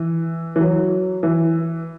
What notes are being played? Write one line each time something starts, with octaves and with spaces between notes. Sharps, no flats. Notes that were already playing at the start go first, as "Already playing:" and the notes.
Already playing: E3
E3
F#3
E3